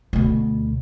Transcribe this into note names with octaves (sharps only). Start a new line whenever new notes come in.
D2 B2